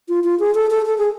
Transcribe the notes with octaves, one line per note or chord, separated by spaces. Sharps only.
F4
F4
G#4
A4
A4
A4
G#4